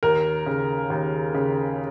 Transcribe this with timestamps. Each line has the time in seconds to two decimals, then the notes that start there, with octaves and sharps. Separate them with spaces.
0.03 D#2 A#4
0.46 C#3
0.90 D#2
1.34 C#3